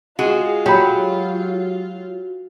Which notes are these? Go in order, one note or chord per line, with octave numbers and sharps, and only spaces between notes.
G#3 F4 F#4 G#4
F#3 G4 B5